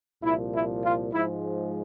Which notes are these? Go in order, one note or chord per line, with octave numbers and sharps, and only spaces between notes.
C2 A#2 F3 E4
E4
F4
G#2 F3 G#3 E4